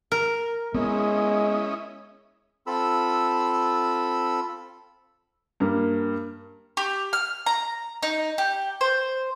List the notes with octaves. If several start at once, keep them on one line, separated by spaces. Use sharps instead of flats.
A#4
G#3 B3 C#4 E4 D#5
C4 F4 A4 B5 E6
G2 A#3
G4
F6
A#5
D#4
G4
C5